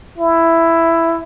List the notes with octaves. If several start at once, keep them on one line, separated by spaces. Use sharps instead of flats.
E4